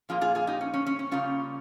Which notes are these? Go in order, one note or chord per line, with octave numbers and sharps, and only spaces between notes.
A#2 F3 A#3 F4 G#4
F4 G#4
F4 G#4
D#4 G4
C#4
C#4
C#4
C#4
C#3 G3 A#3 C#4 F4